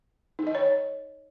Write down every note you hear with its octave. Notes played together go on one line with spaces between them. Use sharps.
D#4
D#5
C#5